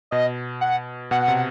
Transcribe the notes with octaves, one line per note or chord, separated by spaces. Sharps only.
B2 D#5
F#5
B2 F#5
C3